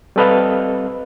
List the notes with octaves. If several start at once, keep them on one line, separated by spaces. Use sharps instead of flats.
G3 C4 A4 B4 D#5 F5